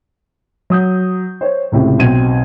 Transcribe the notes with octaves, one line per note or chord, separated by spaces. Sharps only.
F#3 D#6 G6
C5 C#5
C#2 A2 C3
B1 C4 G#6 D#7